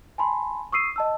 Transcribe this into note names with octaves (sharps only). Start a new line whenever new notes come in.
G#5 A5 B5 C6
C#6 D#6 E6 C7 D#7
D#5 A5 E6